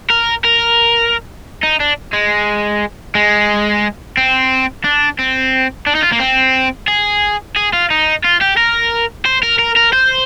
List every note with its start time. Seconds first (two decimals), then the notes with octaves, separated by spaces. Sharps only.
0.10 A#4
0.44 A#4
1.63 D#4
1.80 D4
2.13 G#3
3.15 G#3
4.17 C4
4.84 D4
5.19 C4
5.87 D4
5.95 D#4
6.03 F4
6.12 A#3
6.20 C4
6.88 G#4
7.56 G#4
7.73 F4
7.90 D#4
8.24 F4
8.41 G4
8.57 A#4
9.25 C5
9.43 A#4
9.59 A#4
9.77 A#4
9.93 C5